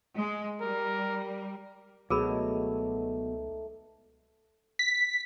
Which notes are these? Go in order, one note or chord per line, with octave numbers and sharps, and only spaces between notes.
G#3
G3 A#4
C#2 B2 F#3 A3 D#4 G#4 A#4 B5
B6